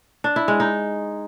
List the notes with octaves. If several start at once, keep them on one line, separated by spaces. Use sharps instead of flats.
D4
E4
G#3
D#4